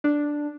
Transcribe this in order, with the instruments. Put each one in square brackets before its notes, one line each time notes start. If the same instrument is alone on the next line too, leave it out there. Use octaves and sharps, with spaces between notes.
[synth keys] D4